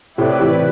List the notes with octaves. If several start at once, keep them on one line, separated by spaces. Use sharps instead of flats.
A2 C3 A3 E4 G4 B4 D5
C3 E3